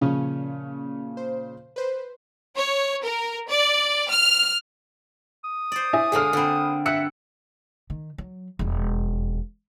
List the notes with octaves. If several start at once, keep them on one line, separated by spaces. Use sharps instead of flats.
A#2 C#3 F3 C#4
C5
B4 C5
C#5
A#4
D5
F6
D#6
C5 D5
E4 E5 G#5
D3 G#3 A#3 G#4 A4 F6
D3 C4 A4 B5
G2 E5 E6 F#6 C#7
D#3
F#3
E1 F2